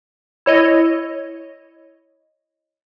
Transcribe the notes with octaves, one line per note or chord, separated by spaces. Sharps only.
E4 C#5 D#5